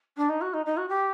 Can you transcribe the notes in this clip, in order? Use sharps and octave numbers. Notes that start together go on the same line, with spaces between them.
D4
D#4
F#4
D#4
D#4
F#4
G4